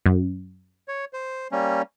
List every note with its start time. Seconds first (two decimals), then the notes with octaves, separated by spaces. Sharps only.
0.06 F#2
0.88 C#5
1.13 C5
1.52 G3 A#3 C#4